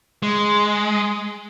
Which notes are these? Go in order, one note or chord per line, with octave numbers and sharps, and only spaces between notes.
G#3